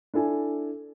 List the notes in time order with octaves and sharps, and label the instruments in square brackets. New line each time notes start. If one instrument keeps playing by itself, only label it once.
[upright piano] D4 E4 A4 G#5